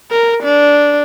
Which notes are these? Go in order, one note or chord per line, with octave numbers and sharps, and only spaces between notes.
A#4
D4